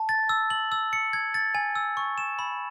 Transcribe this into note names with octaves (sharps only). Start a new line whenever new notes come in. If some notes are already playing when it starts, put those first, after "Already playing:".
Already playing: A5
A6
E6
F#7
E6
C#7
G#6
A6
G#5
E6
C#6
E7
B5